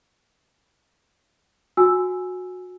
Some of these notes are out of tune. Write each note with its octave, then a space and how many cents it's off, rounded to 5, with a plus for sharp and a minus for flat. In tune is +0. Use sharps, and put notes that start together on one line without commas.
F#4 -20 G#5 +0 E6 +0